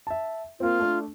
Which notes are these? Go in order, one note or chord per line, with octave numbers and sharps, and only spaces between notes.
E5 A5
A#3 C4 F4
A3 D4